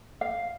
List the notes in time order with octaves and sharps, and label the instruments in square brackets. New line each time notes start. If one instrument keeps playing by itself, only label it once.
[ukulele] F5